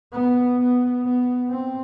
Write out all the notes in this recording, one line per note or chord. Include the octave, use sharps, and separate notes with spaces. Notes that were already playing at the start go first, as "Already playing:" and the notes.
B3
B3
B3
C4